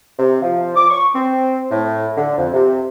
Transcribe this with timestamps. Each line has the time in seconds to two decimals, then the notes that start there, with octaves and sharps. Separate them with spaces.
0.19 C3
0.42 F3
0.76 D6
0.90 C#6
1.15 C4
1.71 A2
2.17 D3
2.37 F2
2.53 C3